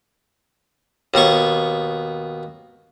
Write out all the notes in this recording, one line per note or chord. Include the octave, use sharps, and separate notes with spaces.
D#2 B2 F#5 C#6